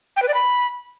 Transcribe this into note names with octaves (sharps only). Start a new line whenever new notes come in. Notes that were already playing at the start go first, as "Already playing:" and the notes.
G5
B4
D5
B5